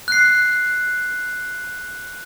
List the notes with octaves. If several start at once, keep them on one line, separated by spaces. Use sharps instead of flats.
F#6 C7